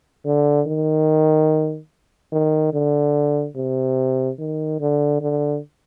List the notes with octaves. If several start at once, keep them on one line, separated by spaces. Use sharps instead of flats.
D3
D#3
D#3
D3
C3
D#3
D3
D3